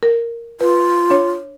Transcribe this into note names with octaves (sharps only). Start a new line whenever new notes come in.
A#4
F4 B4
D4 C#5